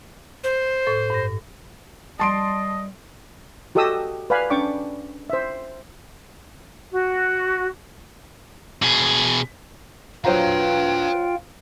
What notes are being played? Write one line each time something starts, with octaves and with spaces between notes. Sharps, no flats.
C5
A2 A4
G2 A#6
G3 D#5 A5 C6 D7
F#4 G4 A4 D#5 D#6 E6
B4 D5 F5 G#5 B5
C#4 D4 D5 G5 C#6 D6
C5 E5
F#4
B2 G#4
F#3 F4 B4 C5 F5 G5 A#5